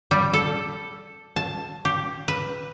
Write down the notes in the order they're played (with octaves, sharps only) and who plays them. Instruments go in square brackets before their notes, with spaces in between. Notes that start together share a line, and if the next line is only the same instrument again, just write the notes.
[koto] G3
A4
A5
G4
B4